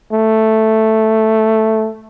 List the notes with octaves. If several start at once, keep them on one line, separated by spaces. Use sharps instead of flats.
A3